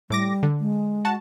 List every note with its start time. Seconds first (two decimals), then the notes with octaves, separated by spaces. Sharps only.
0.10 A2 G3 D6 A#6
0.43 D3
0.60 G#3
1.05 F#4 A5